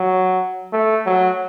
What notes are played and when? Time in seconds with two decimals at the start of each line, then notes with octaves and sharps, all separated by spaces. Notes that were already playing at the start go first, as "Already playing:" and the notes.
Already playing: F#3
0.73 A3
1.06 F#3